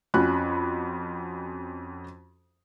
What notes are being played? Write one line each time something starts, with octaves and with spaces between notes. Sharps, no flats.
F2 C#4 F#4 B5 F#6